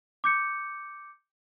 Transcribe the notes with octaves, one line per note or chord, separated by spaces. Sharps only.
D6 G6 C#7